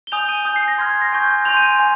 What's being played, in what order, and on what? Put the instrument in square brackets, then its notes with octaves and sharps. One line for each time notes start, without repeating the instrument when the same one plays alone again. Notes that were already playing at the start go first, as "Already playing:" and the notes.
[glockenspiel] G7
G#5 D#6 G6 F7
D#7
G#5 D#6 G6
C7
A#6
C6 F6 G#6
G#6
A#6
G#5 C#6 G6
G#5 C6 G6 F7
D#7
G#5